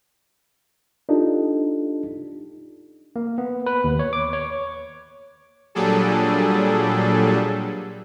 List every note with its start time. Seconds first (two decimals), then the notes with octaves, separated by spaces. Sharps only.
1.09 D4 D#4 F4 G4 A4
3.16 A#3
3.38 B3
3.66 B4
3.84 D#2
3.99 C#5
4.13 D6
4.33 C#5
5.75 A#2 F#3 G3 D4 G#4 A4